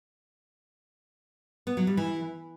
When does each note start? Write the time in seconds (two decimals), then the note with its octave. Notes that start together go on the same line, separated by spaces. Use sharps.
1.67 B3
1.77 F#3
1.87 G3
1.97 E3